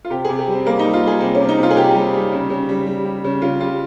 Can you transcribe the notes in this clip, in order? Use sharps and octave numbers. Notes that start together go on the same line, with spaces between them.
F4
C3 G4
C3 G#4
G4
G3 C4
G3 A#3
G3 D#4
F4
G3 G#4
C3 C4
C#4
C3
D#4
C3 F4
G#4
C3 G4
G3
G3
C#3
C#3
G3
G3
G3
C#3
C#3 F4
G3 F4